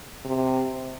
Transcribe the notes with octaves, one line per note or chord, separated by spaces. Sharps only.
C3